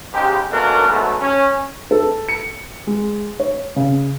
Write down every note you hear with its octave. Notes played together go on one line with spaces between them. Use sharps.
G#2 C#3 G#3 D#4 G4
B2 A3 A#3 C#4 D4 A#4
G#2 B2 F#3 G#3 A3
C#4
A4
C#7
G#3
C#5
C#3